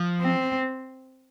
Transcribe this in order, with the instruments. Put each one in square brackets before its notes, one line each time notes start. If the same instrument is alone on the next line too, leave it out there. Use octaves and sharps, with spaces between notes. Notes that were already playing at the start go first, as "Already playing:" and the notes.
Already playing: [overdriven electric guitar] F3
[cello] C4